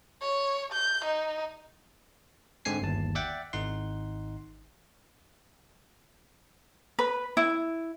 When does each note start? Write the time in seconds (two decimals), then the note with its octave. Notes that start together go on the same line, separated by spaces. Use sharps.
0.22 C#5
0.73 G6
1.05 D#4
2.65 G#2 D3 C4 G#5 C7
2.82 G1 D#2 A5
3.15 D5 E5 F#5 G5 A6
3.53 G#1 D#4 F#5 C6
6.99 B4
7.37 E4